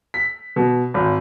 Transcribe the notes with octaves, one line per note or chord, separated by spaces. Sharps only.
B6
B2
G#1